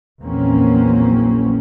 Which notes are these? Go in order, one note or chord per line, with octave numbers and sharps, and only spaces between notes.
A#1 E2 F#3 A#3 C4 C#4